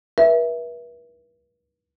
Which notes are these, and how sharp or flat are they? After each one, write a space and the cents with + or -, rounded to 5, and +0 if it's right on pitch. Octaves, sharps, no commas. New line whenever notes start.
B4 -40 E5 +0